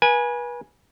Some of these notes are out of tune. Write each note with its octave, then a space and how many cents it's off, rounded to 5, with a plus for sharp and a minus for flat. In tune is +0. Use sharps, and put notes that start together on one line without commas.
B4 -35 G#5 +0